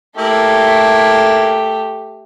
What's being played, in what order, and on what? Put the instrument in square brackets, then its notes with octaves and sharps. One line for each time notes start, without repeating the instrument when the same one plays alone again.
[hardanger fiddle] A3 G4 [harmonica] A#3 E4